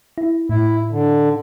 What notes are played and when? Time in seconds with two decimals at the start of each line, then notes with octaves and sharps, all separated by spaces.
0.18 E4
0.49 A2 E4
0.91 D3